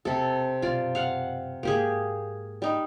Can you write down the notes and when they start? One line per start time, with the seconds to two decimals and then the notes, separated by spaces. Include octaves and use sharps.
0.05 E1 C3 C4 A4
0.62 F#2 B2 F4 D5
0.95 F5 F#5
1.63 G#2 A#3 G4 G#4
2.62 G3 D#4